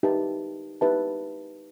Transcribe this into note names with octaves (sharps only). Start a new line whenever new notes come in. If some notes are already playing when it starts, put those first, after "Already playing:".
D#4 G4 B4 E5 A5
D#4 G4 B4 E5 A5